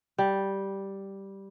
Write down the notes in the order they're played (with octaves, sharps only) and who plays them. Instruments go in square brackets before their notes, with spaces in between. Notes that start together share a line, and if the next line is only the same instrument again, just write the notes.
[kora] G3